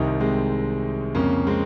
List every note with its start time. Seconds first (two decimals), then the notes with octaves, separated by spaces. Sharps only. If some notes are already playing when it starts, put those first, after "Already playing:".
Already playing: C2 C3 D#3 C4 D#4
0.20 G#3 C4
1.15 F2 C#3 A#3 C#4
1.47 G#3 C4